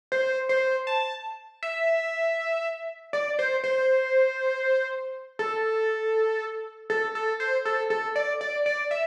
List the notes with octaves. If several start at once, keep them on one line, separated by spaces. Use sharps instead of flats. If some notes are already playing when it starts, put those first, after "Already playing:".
C5
C5
A5
E5
D5
C5
C5
A4
A4
A4
C5
A4
A4
D5
D5
D5
E5